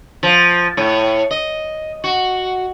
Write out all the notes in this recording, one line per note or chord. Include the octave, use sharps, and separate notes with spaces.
F3
A2
D#5
F#4